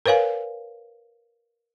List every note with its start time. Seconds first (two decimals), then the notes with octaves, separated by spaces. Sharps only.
0.06 A#4 B4 C#5 F5 G#5